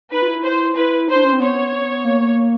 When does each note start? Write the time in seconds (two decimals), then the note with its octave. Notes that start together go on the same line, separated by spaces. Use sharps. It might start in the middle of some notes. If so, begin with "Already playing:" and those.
0.11 D#4 B4
0.22 F4
0.27 E4
0.43 C5
0.75 E4 B4
1.08 D#4 C5
1.16 D4
1.25 C#4
1.33 C4
1.40 B3 C#5
2.05 A#3